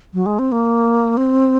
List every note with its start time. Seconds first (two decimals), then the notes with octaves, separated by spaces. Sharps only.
0.14 F#3
0.26 G#3
0.39 C4
0.52 A#3
1.17 C4